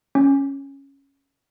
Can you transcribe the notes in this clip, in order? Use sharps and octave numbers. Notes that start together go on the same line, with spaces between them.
C#4